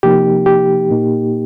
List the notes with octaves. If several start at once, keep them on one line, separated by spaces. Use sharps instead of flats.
C3 F3 A#3 D#4 G4
G4
A#2 A#3 D#4